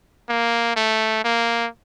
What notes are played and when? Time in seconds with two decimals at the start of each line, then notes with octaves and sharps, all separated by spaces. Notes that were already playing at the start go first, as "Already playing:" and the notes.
0.29 A#3
0.77 A3
1.25 A#3